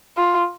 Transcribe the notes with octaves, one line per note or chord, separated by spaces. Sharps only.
F4